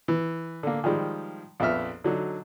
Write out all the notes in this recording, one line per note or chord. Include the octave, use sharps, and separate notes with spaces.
E3
D3 A#3
D#3 F3 G3 G#3
A#1 F2 B3 E5 F6
D3 F#3 D#4